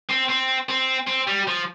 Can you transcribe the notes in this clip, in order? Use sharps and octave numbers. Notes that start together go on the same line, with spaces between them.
C4
C4
C4
C4
G3
F3